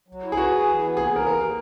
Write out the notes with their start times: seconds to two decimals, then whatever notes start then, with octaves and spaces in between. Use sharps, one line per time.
0.08 F#3
0.23 E4
0.32 G#4
0.37 F#4 B4
0.52 G#4
0.67 E3
0.82 B3
0.96 A#3 G#4
1.07 G#4
1.11 E3 A#4
1.26 D#2 A#4
1.41 A#3